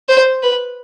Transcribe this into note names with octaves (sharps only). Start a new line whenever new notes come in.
C5
B4